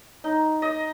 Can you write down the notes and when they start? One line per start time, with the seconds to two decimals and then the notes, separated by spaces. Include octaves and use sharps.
0.24 D#4
0.62 D#5